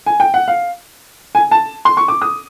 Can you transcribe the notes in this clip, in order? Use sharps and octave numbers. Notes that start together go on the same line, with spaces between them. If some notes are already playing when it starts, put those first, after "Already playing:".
G#5
G5
F#5
F5
G#5
A5
C6
C#6
D6
D#6